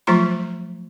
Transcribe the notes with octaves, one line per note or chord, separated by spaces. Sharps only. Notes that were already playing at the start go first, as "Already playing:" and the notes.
F3 F#3 A3 F4 A#5 C6